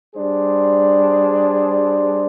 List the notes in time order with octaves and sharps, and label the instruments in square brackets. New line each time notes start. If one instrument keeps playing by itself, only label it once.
[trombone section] G3 D4 G#4 C5